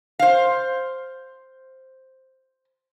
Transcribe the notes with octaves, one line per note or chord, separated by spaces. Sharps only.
C5 F5